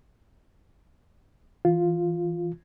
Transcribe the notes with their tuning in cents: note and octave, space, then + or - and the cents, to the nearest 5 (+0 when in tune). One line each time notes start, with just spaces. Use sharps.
E3 +0 F4 +0